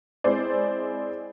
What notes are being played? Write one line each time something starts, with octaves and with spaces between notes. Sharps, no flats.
G#3 C4 E4 C5 D5